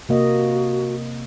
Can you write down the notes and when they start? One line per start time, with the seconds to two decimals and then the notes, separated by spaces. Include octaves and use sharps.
0.09 C3 A#3 F#4 D#5